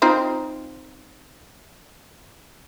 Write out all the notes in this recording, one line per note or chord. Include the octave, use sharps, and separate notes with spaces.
C4 D#4 F4